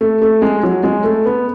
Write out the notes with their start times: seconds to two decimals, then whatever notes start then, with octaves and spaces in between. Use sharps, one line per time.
0.01 A3
0.22 A3
0.42 G#3
0.63 F#3
0.83 G#3
1.04 A3
1.25 B3